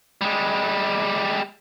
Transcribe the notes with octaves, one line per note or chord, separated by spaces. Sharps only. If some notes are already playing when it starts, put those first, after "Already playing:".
G3 G#3